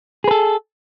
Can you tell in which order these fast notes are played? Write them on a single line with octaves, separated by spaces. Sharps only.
G#4 B4 A4